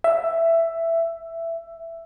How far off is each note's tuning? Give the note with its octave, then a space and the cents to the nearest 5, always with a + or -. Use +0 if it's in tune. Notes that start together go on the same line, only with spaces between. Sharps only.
E5 +10